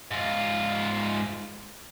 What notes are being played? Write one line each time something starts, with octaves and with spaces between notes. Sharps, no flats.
G#2 F4